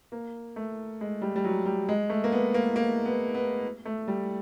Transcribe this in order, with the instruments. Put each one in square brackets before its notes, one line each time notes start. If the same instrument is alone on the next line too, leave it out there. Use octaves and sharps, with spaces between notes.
[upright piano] A#3
A3
G#3
G3
G3
F#3
G3
G#3
A3
A#3
B3
A#3
A#3
B3
B3
A3
G3